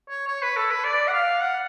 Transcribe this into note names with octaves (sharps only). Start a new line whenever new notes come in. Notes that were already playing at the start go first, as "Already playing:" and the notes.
C#5
C#5
B4
A4
B4
D5
F#5
F5
F#5